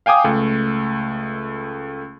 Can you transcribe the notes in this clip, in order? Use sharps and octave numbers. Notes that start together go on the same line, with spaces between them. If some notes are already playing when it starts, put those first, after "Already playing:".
F5 G5 G#5 D6 D#6
C#2 A3